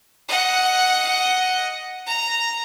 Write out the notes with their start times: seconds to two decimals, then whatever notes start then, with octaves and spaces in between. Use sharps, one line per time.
0.28 D#5 F#5
2.06 A#5